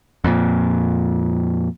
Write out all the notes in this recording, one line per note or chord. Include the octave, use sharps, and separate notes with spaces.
F2 A#2